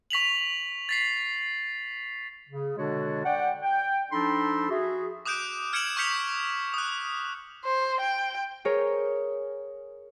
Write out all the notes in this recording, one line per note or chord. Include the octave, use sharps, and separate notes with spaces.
C#6 B6 F7 F#7
A6 B6 C7
C#3
B2 D3 G#3 D4 F#4 C#5
D5 F#5 G5
G5
F3 D4 D#4 A4 B5 C6
F#4 G#4 E5
D6 D#6 F#6 G6 D7
F6 G#6 C#7 D7 E7 F#7
C#6 F6 G6 B6 C#7 F7
D#6 F#6
C5
G5
G#4 A#4 C#5